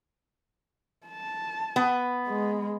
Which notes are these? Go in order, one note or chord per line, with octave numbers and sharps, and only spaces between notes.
A5
B3
G#3